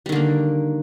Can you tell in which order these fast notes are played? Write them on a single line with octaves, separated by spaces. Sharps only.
G3 D#3 D3 A#3